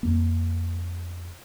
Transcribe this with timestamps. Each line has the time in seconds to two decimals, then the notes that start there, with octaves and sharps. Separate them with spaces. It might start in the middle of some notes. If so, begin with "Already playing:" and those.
0.03 F2 A#3